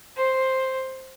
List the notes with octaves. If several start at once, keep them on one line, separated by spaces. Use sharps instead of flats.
C5